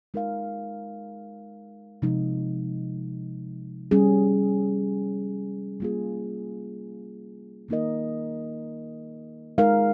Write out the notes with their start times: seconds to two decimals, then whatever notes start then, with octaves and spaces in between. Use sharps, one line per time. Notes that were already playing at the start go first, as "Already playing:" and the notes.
0.14 G#3 D#4 A#4 F5
2.02 C3 F3 G#3 D#4
3.91 G3 C#4 G#4
5.80 G3 A#3 F4 G#4
7.69 D#3 A#3 D#4 A#4 D#5
9.58 G#3 D#4 A#4 F5